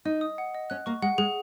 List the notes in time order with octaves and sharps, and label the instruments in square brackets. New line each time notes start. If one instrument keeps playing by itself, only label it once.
[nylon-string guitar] D#4 [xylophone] D#5
[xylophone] D#6
F#5
D#5
[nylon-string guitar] C#4 [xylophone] F#6
[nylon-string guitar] A#3 [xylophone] C#6
[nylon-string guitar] G#3 [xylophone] F#5
[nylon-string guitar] G#3 [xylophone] G#4